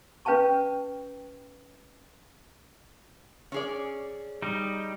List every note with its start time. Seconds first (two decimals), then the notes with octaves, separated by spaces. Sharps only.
0.25 C#4 B4 F5 G5 A5 C#6
3.52 C#4 G#4 D5
4.42 G3 D#4